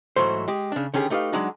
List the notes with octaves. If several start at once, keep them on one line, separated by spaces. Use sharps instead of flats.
G#2 E3 F#3 A3 C5
G#3 G4
C#3 D4
D3 D#3 C#4 G4 G#4
A3 D#4 G4 B4 F5
F#3 G#3 D4 D#4 F#4